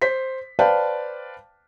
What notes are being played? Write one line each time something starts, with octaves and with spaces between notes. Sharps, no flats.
C5 B6
B4 C5 D5 F5 G5 A5